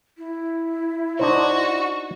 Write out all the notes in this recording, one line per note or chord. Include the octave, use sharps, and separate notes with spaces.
E4
D4 D#4 F#4 C5 C#6